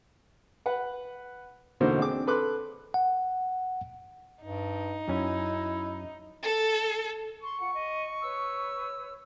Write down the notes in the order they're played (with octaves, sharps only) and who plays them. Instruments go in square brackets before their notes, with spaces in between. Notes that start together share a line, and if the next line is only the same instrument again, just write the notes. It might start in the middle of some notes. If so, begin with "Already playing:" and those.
[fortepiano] B4 F#5
E2 B2 D3 A#3 D#4 C5
C4 D4 G#4 D6
A4 B4 C6 D6 F#6
[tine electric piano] F#5
[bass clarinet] G2 [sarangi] D#4
[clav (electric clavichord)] F#2 C#4 G#5 [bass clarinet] E4
[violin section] A4
[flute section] C6 [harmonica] C#6
[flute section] F4 F#5
D#5
B4 C#5 E6